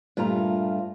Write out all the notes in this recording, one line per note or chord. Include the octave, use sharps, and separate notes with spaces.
G2 A#2 A3 F4 A#5